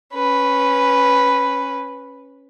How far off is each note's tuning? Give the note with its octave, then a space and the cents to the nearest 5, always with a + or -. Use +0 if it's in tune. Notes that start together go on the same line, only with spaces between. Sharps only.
C#4 -10 B4 +0